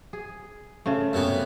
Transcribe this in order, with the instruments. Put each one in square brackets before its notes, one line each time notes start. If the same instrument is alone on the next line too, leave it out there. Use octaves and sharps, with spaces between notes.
[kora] G#4
C#3 A3
[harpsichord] F#2 C3 B3 [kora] E5